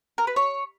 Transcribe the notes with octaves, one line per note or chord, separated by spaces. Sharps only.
A#4
B4
C#5